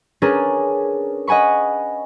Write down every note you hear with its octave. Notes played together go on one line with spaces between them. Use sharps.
C#4 D4 G#4 A#4 B4
D#5 F#5 G#5 B5 C#6